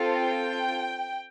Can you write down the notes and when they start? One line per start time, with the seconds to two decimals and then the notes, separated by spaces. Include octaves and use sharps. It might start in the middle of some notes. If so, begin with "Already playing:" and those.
Already playing: C4 F4 A4
0.18 G5